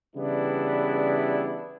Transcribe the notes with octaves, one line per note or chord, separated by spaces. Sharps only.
C#3 E3 G3 B3 D4 E4